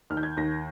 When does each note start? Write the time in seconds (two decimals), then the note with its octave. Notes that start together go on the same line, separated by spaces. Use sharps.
0.10 D#2 F6
0.17 G6
0.23 G#6
0.37 D#2 A#6